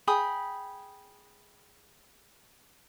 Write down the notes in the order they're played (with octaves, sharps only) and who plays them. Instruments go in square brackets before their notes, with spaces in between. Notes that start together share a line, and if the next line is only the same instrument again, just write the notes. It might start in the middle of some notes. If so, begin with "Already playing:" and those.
[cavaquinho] G#4 G5 B5 D#6